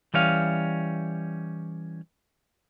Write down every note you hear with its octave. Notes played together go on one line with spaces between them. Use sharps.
E3 G3 C#4 F5